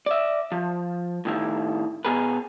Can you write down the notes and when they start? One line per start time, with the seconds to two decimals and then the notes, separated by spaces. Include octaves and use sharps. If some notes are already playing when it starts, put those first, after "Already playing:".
0.06 D5 E5
0.52 F3
1.25 A2 D#3 E4
2.05 B2 G#4 A#4 B4